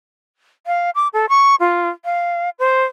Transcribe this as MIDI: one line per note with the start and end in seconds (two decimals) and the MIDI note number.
0.67 0.90 77
0.95 1.08 86
1.13 1.26 69
1.29 1.55 85
1.60 1.89 65
2.05 2.50 77
2.59 2.84 72